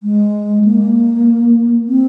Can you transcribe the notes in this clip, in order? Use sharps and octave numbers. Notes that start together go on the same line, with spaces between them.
G#3
A#3
C4